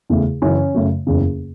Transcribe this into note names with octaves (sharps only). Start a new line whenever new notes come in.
E2 C#3 A3
F#2 C#3 E3 C#4
F#2 C#3 A3
F#1 E2 C#3